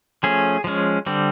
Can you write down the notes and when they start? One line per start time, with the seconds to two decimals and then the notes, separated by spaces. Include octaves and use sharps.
0.23 F3 A3 C#4 G#4
0.64 F3 G#3 C#4
1.06 D3 G3 C4